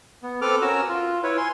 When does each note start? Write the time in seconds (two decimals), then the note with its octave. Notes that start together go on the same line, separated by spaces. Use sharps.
0.23 B3
0.42 C4 A4 B4 D6 F6
0.62 C#4 F#4 A#4 E6
0.89 F4
1.23 E4 B4 C#5
1.37 G#5 C6